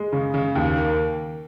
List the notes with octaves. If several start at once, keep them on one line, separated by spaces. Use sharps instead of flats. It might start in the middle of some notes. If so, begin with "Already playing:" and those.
Already playing: G#3
C#3
C#3
D#2
A#3